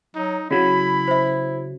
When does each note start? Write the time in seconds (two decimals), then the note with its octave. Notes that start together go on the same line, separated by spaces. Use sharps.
0.15 F#3 D#4
0.51 C#3 F#3 E4 B5
1.08 C5 E5